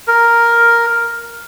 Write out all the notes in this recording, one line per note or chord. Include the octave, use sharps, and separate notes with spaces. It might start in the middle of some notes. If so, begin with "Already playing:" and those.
A#4